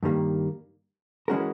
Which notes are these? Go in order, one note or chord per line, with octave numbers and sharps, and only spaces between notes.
G2 D#3 G3 A#3
E3 G#3 C#4 F#4 A#4